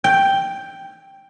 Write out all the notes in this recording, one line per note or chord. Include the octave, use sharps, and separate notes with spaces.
G5